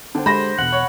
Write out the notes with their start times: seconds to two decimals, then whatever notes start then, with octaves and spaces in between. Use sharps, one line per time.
0.15 D3 C5 G5 A5
0.26 G#3 G4 A4 C5 B5 A#6
0.59 E2 B2 F#5
0.72 C#5